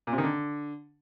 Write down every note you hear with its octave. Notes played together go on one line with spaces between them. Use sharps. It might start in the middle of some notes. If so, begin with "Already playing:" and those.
A#2
C3
D#3
D3